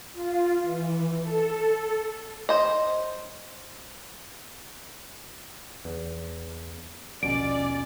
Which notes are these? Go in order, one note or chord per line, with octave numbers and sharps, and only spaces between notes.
F4
E3
A4
C5 D#5
E2
D#1 A#1 B2 C#4 D5 D7